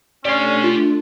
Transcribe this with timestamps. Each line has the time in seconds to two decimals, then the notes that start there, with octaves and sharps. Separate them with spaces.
0.25 A3 C#4 D4 G4 D5 C6
0.64 F4